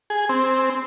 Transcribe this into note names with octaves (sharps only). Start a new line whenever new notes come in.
G#4
C4